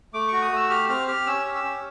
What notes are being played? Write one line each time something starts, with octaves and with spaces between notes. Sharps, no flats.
A3 D6
F#4 C#6
D#6
A3 E6
G4 F6
C4 F6
G4 F6
C#4 E6
G4
E6
C#4